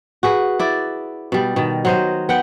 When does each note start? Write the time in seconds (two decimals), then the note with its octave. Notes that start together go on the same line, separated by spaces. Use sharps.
0.23 F#4 G#4 B4
0.59 E4 D5
1.32 B2 G3
1.56 B2 D#3
1.85 F#3 C5 D#5
2.29 B3 F#5 G5